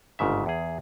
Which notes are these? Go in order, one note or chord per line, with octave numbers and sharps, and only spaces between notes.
G1 G#2 C#3 E5
E2 G#4